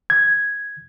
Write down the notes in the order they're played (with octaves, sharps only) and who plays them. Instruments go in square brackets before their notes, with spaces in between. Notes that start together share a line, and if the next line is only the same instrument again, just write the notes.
[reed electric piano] G#6